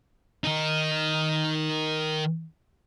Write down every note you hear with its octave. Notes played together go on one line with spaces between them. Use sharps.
D#3 D#4